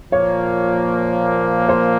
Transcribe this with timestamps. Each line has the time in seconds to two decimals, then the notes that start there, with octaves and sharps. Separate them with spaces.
0.12 A#2 F3 A#3 C#5
1.69 C5